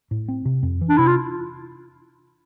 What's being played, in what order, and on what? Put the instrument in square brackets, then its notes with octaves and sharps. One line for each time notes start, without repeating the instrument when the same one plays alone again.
[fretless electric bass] A2
C4
C3
F2
E3
[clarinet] D4
[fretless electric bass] C3 [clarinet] E4
[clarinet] F4